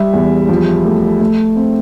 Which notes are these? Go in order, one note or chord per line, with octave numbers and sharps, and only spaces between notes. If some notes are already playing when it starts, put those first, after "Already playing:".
Already playing: G3 E5
E2
F3
A3
A3
C4